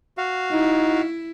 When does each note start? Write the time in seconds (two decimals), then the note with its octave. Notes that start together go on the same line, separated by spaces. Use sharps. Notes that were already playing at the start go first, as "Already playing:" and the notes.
0.18 F#4 F5
0.52 D#4 E4